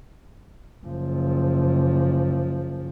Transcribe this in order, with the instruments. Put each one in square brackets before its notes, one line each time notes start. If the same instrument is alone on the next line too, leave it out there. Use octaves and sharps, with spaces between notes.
[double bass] F#1 F3